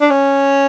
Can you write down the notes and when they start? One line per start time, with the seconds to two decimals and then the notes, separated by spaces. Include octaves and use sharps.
0.01 D4
0.10 C#4